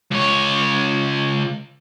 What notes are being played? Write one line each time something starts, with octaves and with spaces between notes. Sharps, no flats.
C#2 C#5